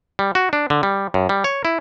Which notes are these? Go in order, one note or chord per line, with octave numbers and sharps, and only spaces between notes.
G3
F#4
D4
D3
G3
F#2
G3
C#5
E4